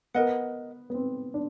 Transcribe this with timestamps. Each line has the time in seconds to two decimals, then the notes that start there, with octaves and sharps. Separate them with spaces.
0.14 B3 A#4 D#5 F#5
0.90 B3
0.94 C4
1.34 D4